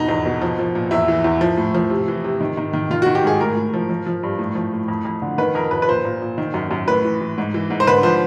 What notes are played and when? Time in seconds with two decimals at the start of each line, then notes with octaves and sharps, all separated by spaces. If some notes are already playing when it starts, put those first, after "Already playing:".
Already playing: F2 B2 D#4
0.09 E2
0.26 B2
0.42 F3
0.59 F3
0.75 A#2
0.91 E2 E4
1.08 E3
1.24 E2
1.41 F3
1.57 A2
1.75 F3
1.90 C3
2.08 E3
2.24 C3
2.41 D#3
2.57 D#3
2.73 D#3
2.90 D#3 F4
3.02 F#4
3.06 D#3
3.15 G4
3.24 G#2 G#4
3.40 A2 A#4
3.56 A2
3.74 F3
3.89 F3
4.07 F3
4.23 G2
4.39 A2
4.55 F3
4.73 A2
4.88 F2
5.05 F2
5.22 D3
5.38 D#3 B4
5.55 F2 A#4
5.71 F2 B4
5.82 B4
5.88 A#2 C5
6.05 A#2
6.22 A#2
6.38 D#3
6.54 F#2
6.71 F#2
6.88 A2 B4
7.05 E3
7.21 E3
7.38 G#2
7.54 E3
7.70 G#2
7.80 C5
7.87 D3 B4
8.03 F3 C5